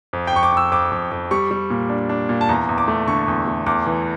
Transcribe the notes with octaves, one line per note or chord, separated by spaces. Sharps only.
F2
G5
F2 C#6
D6
F2 E6
F2 D6
F2
F2
G3 C#6
G3
A#2
D4
D4
A#2
A5
E2 A#5
E2
D6
A3
D3 C#6
E2
A3
E2 D6
E3